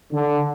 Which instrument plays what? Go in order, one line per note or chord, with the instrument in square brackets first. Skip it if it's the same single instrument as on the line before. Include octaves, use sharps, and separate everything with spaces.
[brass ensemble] D3